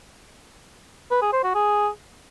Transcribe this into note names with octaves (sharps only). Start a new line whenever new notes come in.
B4
G#4
C5
F#4
G#4